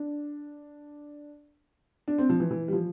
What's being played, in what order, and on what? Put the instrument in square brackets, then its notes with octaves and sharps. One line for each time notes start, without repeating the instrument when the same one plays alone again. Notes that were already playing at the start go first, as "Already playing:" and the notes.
Already playing: [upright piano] D4
D4
C4
F3
E3
E3
G3
F3